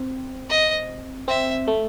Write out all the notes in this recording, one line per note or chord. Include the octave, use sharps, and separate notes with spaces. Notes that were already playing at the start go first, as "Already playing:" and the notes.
Already playing: C4
D#5
C4 E5
A3